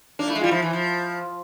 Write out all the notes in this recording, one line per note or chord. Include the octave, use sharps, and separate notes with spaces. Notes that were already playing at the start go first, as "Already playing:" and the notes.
A#3 D4
A3 E4
G#3
G3 F4
F3 E4
E3
F3